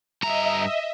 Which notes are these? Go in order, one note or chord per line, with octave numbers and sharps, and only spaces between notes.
G2 D#5 E5 A#5